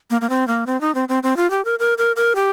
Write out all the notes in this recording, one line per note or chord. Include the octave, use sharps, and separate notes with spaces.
A#3
A#3
C4
A#3
C4
D#4
C4
C4
C4
F4
G4
A#4
A#4
A#4
A#4
G4